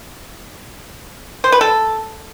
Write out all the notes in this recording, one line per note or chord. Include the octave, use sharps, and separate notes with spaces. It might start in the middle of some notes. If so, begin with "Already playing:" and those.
C5
B4
A4